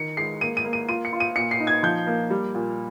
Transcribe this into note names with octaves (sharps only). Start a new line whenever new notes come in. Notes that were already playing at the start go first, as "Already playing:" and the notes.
Already playing: D#3 C#7
G#3 C7
A#3 D#7
D#7
A#3
D#7
F4 D#7
C#7
F4
D#7
A#2 C#7
C7
D#4
G#6
F3 G6
A#3
G3
A#2